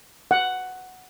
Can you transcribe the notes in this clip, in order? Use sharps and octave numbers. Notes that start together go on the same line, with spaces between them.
F#5